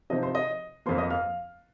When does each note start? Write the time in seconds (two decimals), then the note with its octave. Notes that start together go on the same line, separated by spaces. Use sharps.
0.10 C3 F3 C4 D#4 D#5 D#6
0.23 C5 C6
0.35 D#5 D#6
0.86 F2 F3 A#3 C5 C6
0.98 D#5 D#6
1.10 F5 F6